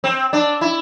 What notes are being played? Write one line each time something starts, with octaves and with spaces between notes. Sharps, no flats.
C4
D4
E4